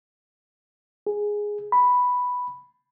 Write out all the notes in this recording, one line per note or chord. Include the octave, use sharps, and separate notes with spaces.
G#4
B5